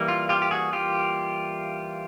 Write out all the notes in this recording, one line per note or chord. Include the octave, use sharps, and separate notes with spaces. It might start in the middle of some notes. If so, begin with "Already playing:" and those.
Already playing: E3 G3 A#3
F4
F4 G4
G4
F#4 G#4
F4 G4